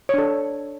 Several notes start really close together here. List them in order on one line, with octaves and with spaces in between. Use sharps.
C#5 D4 A4